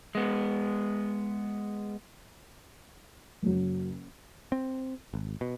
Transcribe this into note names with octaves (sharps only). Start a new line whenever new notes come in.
G#3 B3
F#1 F#3
C4
G#1
B2